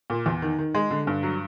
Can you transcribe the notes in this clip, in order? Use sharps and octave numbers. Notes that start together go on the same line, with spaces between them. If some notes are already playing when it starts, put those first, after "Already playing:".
A#2
E2
D#3
D#3
G#3
D3
G2
F#3